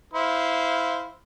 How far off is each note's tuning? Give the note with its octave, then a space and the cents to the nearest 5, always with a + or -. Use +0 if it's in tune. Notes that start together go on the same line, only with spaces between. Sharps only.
E4 -10 C5 -15 F5 +0